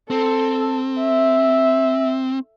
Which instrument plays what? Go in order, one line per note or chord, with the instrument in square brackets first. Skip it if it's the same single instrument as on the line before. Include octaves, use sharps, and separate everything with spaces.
[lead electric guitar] C4 [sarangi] A4
[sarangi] E5